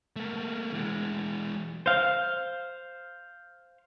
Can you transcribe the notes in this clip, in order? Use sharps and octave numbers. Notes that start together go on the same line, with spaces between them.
A3 A#3
E3 G#3
C5 F5